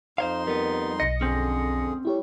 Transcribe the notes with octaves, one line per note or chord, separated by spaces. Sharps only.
F2 D#4 C5 C#5 F5 C6
G3 B3 A#4
B1 D#5 A#6 C#7
F2 D3 C4 C#4 G#4
G3 A3 E4 G4 C#5